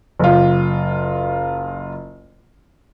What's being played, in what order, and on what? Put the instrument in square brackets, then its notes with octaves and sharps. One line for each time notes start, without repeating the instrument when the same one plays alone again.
[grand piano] F#1 F4